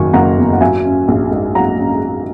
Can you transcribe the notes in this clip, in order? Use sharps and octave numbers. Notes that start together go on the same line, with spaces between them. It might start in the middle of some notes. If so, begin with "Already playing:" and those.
Already playing: F#1 D#3 F#3 G#5 C#6
F#1 F#5 A#5
E2
F#5
F#3 E5 G#5
C#4
A#1
G#2
F#3 F#5 A#5
C#4